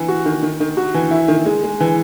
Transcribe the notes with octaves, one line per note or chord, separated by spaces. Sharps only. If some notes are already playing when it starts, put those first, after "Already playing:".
Already playing: E3
F#4
D#3
D#3
D#3
F#4
E3
E4
D#3
G#3
G#3
E3